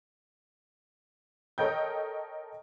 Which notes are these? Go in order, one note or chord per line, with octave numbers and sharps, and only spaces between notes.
A4 A#4 C#5 D#5 G5 G6